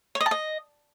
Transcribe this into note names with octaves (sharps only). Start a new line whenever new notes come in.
C#5
D#5
A5
D#5